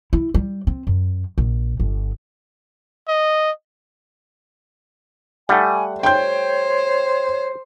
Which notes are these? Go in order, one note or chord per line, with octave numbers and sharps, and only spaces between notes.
E4
G3
C4
F#2
A#1
G1
D#5
G3 A3 F#5 G#5
C5 C#5 G5 C6 G6